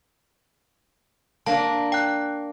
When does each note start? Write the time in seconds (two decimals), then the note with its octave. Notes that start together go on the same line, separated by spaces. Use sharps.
1.46 A#3 D4 A5
1.92 G5 F#6